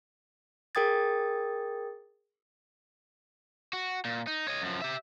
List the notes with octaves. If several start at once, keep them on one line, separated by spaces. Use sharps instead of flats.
G#4 A#4 G5 D#6 G#6 A6
F#4
A#2
D#4
C#5 D#5
F#2 F3
G4 E5